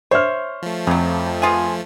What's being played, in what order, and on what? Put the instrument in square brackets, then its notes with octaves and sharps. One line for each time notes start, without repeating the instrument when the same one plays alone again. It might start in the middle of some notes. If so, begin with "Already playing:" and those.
[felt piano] C5 E5 F6 [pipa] C#5
[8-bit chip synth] F3 A3
[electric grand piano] F2 [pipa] C#3 F#3
[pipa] B3 F4 G#4